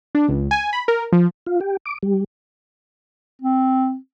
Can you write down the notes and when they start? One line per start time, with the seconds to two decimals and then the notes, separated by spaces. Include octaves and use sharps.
0.15 D4
0.28 C#2
0.51 G#5
0.73 B5
0.88 A#4
1.12 F3
1.47 F4
1.61 G4
1.86 D6
2.03 G3
3.42 C4